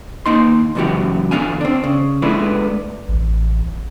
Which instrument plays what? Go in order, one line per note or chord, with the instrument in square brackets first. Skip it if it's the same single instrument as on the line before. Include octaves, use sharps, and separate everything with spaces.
[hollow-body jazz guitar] A#3 D#4 C6
C#2 F#2 E3 B3 F#4 G4
E2 D3 B3 F5 G#5
C4 D4
C#3
G#3 A3 B3 D4 E4 B4
[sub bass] A1